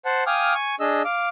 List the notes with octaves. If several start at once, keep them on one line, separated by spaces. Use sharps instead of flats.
C5 F#5 A5
F5 G5 G#5 D6 D#6 F6
G#5 C#6
D4 G#4 D#5 E6
F5 D6